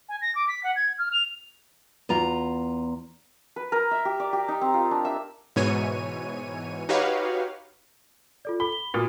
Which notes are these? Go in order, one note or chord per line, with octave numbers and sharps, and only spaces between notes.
G#5
A#6
D6
B6
F#5
G#6
F6
F7
E2 F4 A#5
B4
A#4
E5
G4
D5
G4
D#4
C4
F4
D4
E5
G#2 B2 E3 C#5 G#5 D#7
D#4 F#4 G4 B4 C#5 F5
F4 A4 D5
A4 B5 G7
G7
A#2 F#4 D#6